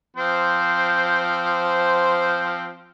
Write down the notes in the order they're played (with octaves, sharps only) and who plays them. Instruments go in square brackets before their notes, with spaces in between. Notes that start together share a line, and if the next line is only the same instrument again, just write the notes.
[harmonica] F3 C4 C5